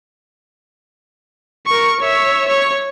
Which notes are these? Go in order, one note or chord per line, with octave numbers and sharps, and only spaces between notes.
A#4 C#6
C#5 E5
C#5